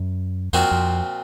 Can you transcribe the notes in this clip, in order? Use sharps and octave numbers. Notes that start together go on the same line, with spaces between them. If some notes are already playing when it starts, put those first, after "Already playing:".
Already playing: F#2
F2 A#2 F3 C4 F#4
F2